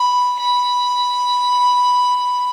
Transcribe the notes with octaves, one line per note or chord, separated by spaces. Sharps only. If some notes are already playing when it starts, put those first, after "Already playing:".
Already playing: B5
B5